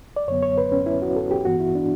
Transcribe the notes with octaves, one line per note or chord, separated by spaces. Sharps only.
D5
F#2 D3 F#3 B3 C#5
C#5
B4
C#4
E4
F#4
A4
G4
G2 E3 B3 F#4
E4
D4